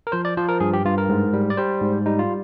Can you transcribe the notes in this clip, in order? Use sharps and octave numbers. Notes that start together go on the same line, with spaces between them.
A#4
F3 C5
D5
F3 C5
A#4
G2 G#4
G4
G2 F4
A#4
G#2
G3
D5
G3 C5
G#2
G3 D#4
F4